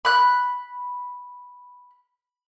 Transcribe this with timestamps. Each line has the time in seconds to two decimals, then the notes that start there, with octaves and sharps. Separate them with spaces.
0.05 B5 F#6